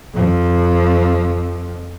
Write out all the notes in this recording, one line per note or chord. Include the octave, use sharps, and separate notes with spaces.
F2 F3